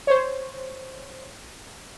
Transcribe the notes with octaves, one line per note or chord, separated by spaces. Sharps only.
C5 C#5